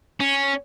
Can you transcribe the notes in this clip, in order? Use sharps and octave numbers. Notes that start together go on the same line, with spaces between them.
C#4